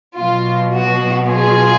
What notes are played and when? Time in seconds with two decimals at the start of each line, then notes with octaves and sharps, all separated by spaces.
0.19 B2 F#3 F4
0.73 F#4
1.27 F4 G#4